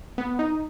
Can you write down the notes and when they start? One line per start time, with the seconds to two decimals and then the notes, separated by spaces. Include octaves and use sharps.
0.18 B3
0.39 D#4